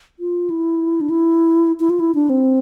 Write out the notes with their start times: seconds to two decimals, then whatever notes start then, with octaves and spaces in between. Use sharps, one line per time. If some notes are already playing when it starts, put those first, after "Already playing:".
0.20 F4
0.50 E4
1.01 D4
1.10 E4
1.80 E4
1.90 F4
2.00 E4
2.15 D4
2.30 C4